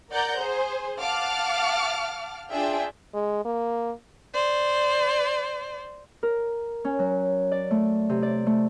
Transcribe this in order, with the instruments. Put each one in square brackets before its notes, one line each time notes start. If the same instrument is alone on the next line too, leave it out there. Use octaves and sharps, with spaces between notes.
[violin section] A#4 D5 F#5 A#5 G6
G#4 C5
F5 F#5 A5 D6 F6
D4 F4 G#4 E5 G5
[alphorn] G#3
A#3
[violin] C5 D5
[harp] A#4
C#4
F#3
D5
A3
C3
D5
A3